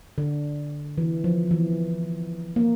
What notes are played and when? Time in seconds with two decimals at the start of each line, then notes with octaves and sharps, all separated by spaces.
0.18 D3
0.98 E3
1.24 F3
1.51 E3
2.56 A#3